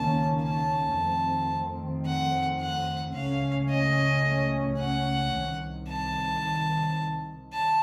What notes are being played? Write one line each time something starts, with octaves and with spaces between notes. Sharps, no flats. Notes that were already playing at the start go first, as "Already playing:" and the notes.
Already playing: C#2 C3 D#3 A#3 C#4 A5
A5
F2 D#3 A3 C4
F#5
F#5
C#2 C#3 A3 C#4 F5
D#5
F#5
C2 C3 D#3
A5
A5